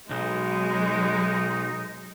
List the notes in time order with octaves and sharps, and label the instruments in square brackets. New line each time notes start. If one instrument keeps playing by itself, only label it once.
[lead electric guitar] B1 [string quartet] F#3 G#3 [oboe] D#4